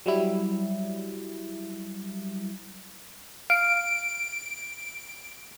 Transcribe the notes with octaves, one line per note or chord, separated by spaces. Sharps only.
F#3 G3 E4
F5 D7